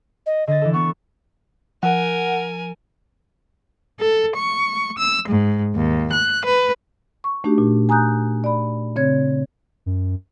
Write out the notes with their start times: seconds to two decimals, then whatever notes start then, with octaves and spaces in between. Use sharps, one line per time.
0.26 D#5
0.47 D3 D#5 A6
0.62 E3 A4
0.74 B3 C#6
1.83 F3 A#4 F#5 G#5
4.01 A4
4.36 C#6
4.98 E6
5.29 G#2
5.76 D#2
6.12 F#6
6.44 B4
7.24 C#6
7.44 A3 D4 D#4 F#4 G4
7.58 A#2
7.89 G#5 A#5 D#6 F#6 G6
8.44 D5 B5
8.96 C#3 C4 C#5 G#6
9.86 F#2